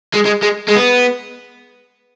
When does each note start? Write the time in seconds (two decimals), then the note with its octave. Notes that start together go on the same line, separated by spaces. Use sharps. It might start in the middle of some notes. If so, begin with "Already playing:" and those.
0.14 G#3
0.25 G#3
0.43 G#3
0.69 G#3
0.76 B3